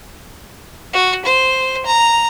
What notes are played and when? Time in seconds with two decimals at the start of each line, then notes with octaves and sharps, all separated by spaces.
0.93 F#4
1.26 C5
1.86 A#5